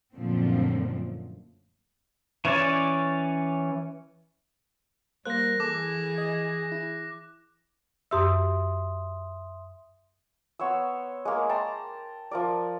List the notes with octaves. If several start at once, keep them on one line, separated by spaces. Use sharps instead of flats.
F#2 A#2 D3 F3 A3 C4
E3 C#4 C#5 D5
G3 A#3 C5 F#6 A#6
E3 G#4 A4 D6
D#5
E4
F#2 G4 E5 C6 D#6 E6
B3 C#5 C6 E6
G#3 A#3
G5 A5 A#5 C6
F3 A#4 D5